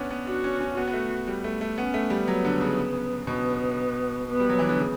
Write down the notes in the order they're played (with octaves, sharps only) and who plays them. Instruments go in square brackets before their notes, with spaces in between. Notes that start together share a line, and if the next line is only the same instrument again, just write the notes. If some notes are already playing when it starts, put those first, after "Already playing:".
Already playing: [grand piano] B3 C#4 D4
B3
[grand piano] D4 [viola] F#4
[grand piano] C#4
C#4
[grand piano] B3 [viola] F#4
[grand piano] B3
A3
G3
A3
A3
[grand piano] B3 [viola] C#4
[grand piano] A3
G3
[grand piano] F#3 [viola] B3
[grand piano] D3
C#3
[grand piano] B2 [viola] B3
[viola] B3
[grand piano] G3
F#3
E3
D3
C#3